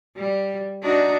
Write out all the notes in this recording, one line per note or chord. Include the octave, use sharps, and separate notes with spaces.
G3
D4 D#4 F#4